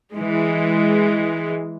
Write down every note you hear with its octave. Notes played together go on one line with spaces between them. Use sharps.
E3 G#3